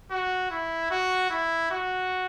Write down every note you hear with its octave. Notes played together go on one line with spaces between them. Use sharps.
F#4
E4
F#4
E4
F#4